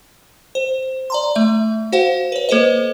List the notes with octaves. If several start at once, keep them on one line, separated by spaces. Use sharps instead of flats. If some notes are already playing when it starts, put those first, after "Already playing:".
C5
D5 A#5 C6
A3 E5
F#4 C5 F5 F#5
B4 C#5
A#3 A4 B4 C5 D#5